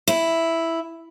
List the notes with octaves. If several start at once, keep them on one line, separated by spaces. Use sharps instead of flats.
E4